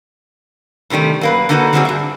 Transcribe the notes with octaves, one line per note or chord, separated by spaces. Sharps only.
A2 C3 D#3 G3 A3
F#2 A#3 B4
D3 A#3 D#4 F#4 A4 B4
D3 G3 A3 C4 F#4 G#4
G2 E5